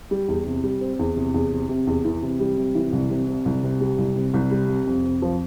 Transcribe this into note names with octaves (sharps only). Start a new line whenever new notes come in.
G3
E2
C3
G3
C4
E2
C3
E2
C3
C3
E2
E3
C3
G3
C3
E3
C2
C3
C3
C2
C3
G3
C2
C3
C2
G3
C3
F2
F2
F3